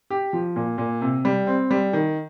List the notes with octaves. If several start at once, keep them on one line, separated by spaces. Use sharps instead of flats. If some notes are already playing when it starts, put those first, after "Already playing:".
G4
F3
A#2
A#2
C3
G3
C4
G3
D#3